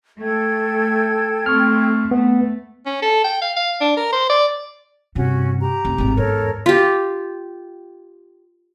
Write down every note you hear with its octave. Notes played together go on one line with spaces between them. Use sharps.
A3 A4 G5 G#6
A3 C4 C#6 F6
A3 B3
C#4
A4
G5
F5
F5
D4
A#4
C5
D5
G2 C3 C#4 F#4
G4 A#5
F1
G#1 A2
E2 G#2 A4 A#4 C#5
F4 G4